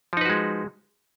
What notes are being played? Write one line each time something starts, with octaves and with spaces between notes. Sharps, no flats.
F3 G#3 D#4 F#4 B4